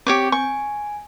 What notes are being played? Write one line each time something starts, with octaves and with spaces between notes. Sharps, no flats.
C4 G4 C#5 D6 G6
G#5 C#6